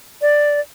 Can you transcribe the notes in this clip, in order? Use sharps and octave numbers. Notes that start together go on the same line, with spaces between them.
D5